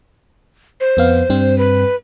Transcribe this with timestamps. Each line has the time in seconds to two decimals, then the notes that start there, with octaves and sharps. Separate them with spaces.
0.81 C5
0.97 F2 B3 F5
1.30 G2 G3 C4
1.58 B4